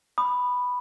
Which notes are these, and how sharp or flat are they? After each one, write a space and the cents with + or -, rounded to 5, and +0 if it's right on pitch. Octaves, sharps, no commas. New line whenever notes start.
B5 +0 D#6 -30